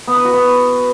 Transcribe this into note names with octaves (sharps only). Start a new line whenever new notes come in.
B3
B4
F#4
B3